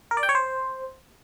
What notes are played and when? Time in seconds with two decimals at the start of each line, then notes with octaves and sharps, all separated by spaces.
0.11 A#4
0.17 D5
0.23 G5
0.29 C#5
0.35 C5